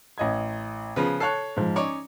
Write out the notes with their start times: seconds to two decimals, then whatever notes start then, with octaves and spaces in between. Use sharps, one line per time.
0.18 A1 D#5 G#6
0.96 C#3 F3 B3 B4
1.20 A4 C#5 A5 F#6 C7
1.57 G#2 F3
1.76 C#4 D#4 C#5 D5